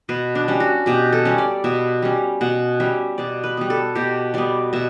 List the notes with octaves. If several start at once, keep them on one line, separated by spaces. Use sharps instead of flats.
B2 B4
D4
G3 C#4
F#4
B2 G4
A4
G3 C#4
D5
B2 E5
G3 C#4
B2 F#5
G3 C#4 E5
B2 D5
B4
G3 B3
A4
B2 G4
G3 B3 D5
B2 E5